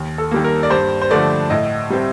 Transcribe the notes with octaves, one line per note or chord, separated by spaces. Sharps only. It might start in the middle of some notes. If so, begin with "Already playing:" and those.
Already playing: D#2
A4
D#3 G3 A#3
A#4
D5
G2 C5
C5
D3 F3 A3 D5
A2 D#5
G3 C4